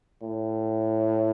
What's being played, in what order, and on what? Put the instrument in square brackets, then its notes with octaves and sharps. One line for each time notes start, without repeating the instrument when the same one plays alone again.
[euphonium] A2